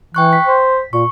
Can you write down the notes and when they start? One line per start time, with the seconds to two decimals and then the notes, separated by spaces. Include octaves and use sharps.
0.15 E3 G5 C#6 F#6
0.33 B6
0.46 C5
0.93 A#2 C#6